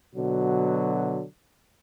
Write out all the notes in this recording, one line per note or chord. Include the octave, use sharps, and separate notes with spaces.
B2 D3 F#3